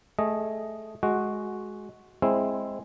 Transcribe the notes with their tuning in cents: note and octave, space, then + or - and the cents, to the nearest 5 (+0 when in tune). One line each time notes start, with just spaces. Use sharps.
A3 -15 G#4 +0 D#5 +0
G#3 +15 F#4 +0
G#3 +0 C4 +10 E4 +0